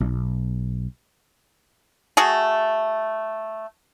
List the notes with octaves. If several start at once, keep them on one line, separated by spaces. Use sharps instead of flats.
B1
A3 F#4 G#4